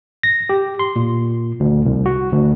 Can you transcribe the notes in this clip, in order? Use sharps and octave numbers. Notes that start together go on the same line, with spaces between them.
A#6
G4
C6
A#2
D2
C2
F#4
D2